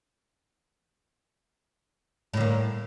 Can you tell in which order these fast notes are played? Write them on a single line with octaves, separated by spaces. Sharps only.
A2 D3 A#3